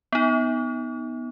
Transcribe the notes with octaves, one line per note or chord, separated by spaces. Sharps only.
B3 D#4